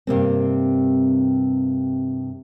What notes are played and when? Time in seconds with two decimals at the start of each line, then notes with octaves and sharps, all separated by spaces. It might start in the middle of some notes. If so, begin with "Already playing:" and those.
0.07 G2 C3 A#3 C4